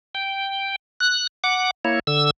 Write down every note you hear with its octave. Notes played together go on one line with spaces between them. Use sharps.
G5
F#6
F#5 D6
A#3 E4 C#5
D3 E6